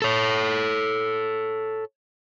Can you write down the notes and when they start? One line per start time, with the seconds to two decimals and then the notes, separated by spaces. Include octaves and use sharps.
0.02 A4 C#5